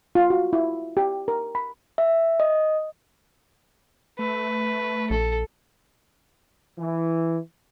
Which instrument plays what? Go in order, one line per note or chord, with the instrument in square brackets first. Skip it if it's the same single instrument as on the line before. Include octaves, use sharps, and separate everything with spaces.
[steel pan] F4
F#4
E4
G4
A#4
B5
[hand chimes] E5
D#5
[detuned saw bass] A3 [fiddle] B4
[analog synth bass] A#1 [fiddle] A4
[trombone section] E3